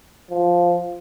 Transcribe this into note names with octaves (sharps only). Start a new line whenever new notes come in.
F3